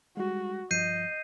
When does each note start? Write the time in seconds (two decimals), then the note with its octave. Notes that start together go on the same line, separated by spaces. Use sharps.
0.17 G3 G#3 F#4
0.71 G2 F3 D#5 G6 C7 D#7